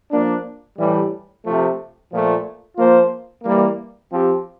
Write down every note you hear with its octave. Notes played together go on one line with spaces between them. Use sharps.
F3 A#3 D4
A2 E3 G3
C3 F3 A3
A#2 F3 A3
F3 A#3 F4 C5
E3 G3 A#3
F3 C4 G4